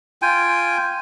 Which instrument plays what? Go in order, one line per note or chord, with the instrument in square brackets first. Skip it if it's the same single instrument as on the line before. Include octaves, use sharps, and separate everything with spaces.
[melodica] F4 G5 G#5